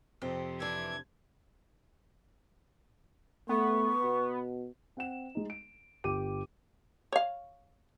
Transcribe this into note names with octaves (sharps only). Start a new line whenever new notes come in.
F2 C3 C4
E3 D4 G#6
A3 B3 C#6
B2
C4 F#5 E7
G#3 D#4
D7
G1 G4 D6 D#7
C#5 F5